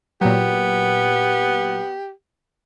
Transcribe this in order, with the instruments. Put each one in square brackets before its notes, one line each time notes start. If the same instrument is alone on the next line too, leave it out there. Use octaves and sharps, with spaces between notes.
[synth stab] A#2 F#3 [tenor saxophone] B3 [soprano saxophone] G4